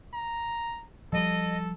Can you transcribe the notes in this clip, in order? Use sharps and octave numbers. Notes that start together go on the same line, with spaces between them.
A#5
F3 G3 A4 D#5